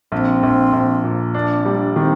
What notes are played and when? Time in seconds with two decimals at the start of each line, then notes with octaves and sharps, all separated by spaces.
0.12 A#1 C4
0.43 A#1
0.73 A#1
1.04 A#2
1.34 A#3 D4
1.55 C4
1.65 G3
1.75 D4
1.96 D#3 C4